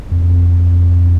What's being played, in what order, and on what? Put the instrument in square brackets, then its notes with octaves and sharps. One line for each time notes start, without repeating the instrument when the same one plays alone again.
[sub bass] F2